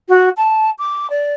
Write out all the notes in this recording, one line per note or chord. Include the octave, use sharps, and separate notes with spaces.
F#4
A5
D6
D5